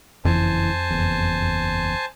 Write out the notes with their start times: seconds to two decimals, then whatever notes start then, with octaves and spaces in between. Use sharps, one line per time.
0.25 F#1 F2 E3 C5 G#5 A5
0.91 F#1 E2